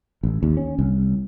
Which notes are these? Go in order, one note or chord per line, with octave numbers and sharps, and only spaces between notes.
A1
D#2
C#4
C2